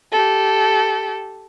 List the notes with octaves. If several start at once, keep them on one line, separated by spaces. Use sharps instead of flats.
G4 A4